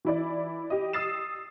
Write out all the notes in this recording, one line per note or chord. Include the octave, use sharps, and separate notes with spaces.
E3 E4 D5
G4 D#5
D#6 E6 A6 C7 E7